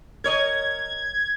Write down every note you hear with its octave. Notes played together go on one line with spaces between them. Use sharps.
A#4 C#5 D#5 G#6